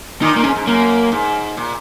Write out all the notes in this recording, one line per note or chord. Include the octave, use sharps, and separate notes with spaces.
A#2 D#3 D#4
A#2 A#3
G#2 C#4
G#2
F#2 A#3
G#2
A#2